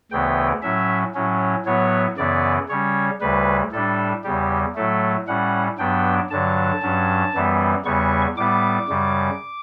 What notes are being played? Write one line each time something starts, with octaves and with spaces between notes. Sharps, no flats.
D2 C#3 E3 B3 G5
A2 F#3 C#4 E5
A2 F#3 C#4
A2 F#3 B3 C#5
F#2 C#3 E3 B3 D5
C#3 G3 C#4 C#5
D2 C#3 G3 B4
A2 G3 D4 A4
E2 C#3 G3 G4
A2 F#3 A3 A4
A2 G3 C#4 F#5
G2 F#3 B3 D4 G5
G2 D3 F#3 A5
G2 F#3 C#4
F#2 E3 G3 B3
E2 C#3 G3 B3 C#6
A2 G3 B3 D6
F#2 C#3 G3